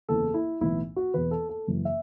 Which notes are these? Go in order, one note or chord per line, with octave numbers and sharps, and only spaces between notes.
F#1 E2 C#3 E3 A4
E4
B1 A2 E3 E4
F#4
E1 E2 E3 B4
A4
A4
F#1 F#2 E3
E5